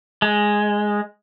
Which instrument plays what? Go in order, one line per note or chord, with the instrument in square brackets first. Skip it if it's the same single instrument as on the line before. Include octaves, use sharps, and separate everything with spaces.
[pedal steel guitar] G#3